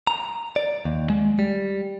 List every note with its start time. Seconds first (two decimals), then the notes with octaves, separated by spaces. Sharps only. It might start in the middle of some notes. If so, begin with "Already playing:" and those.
0.07 A#5
0.56 D5
0.85 D#2
1.10 G#3
1.39 G3